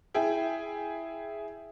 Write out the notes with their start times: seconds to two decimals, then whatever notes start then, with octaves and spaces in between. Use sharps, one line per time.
0.14 E4 G#4 G5